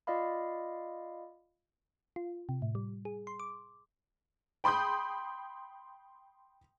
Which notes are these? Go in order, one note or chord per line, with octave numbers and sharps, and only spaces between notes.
F4 D5 D#5 F5 B5
F4
C3
A2
G3
G#4
C6
D6
G5 B5 C6 D#6 G6